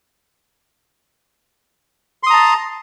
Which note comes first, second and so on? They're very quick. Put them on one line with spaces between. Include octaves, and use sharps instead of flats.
C6 D#6 A#5 A5